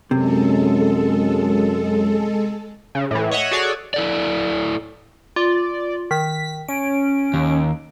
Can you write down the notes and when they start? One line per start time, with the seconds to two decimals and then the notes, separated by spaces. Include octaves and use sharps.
0.11 F#2 C3 G#3 A4
2.95 C#3
3.11 A2 E3
3.31 C#5 D#5 E5 F#5
3.51 F#4 G#4 A4 C#5 D5 G#5
3.94 E4 A4 D5
5.36 F4 D5
6.11 D#3 B6
6.69 C#4 D7
7.34 D#2